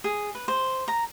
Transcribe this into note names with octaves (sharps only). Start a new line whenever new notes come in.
G#4
B4
C5
A#5